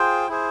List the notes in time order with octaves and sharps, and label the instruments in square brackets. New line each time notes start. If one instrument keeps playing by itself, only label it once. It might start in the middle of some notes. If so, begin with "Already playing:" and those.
Already playing: [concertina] F4 G#4 C5 G5
E4 G#4 C5